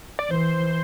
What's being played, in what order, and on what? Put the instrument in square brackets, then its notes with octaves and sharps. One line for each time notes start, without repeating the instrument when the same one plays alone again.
[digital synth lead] D5
[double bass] E3 [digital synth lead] C5